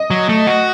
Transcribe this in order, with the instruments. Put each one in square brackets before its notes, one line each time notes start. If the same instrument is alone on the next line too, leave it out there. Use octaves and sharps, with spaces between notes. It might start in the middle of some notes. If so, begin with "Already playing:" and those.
Already playing: [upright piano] D#5
[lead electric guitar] F#3
A3
F#4